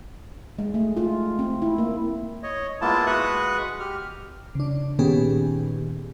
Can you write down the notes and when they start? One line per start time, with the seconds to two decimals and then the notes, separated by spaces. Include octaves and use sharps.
0.59 G#3
0.74 A3
0.97 F4
1.39 C4
1.62 E4
1.78 A#3
2.43 C#5 D#5
2.81 G#3 A#3 B3 E4 F4 A5
3.06 G#3 F#4 B4 C#6 D#6 F#6
3.80 G4 F6
4.55 C#3 D4
4.99 A#2 D#3 B3 C#4 G4 G#4